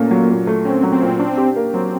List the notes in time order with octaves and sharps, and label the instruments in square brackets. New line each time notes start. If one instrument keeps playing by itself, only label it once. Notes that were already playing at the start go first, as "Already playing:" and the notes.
Already playing: [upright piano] A#2 A3 C#4 [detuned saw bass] A#3
[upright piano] F#3
A#2
A3
[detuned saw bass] C4 [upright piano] C#4
[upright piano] F#3
[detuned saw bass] C4
[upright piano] A#2
D4
G4
A#3
[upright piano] F#3 [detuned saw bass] C4